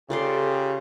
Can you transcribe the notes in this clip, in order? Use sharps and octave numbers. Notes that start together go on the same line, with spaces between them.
C#3 F4 G4 A4 D5 C6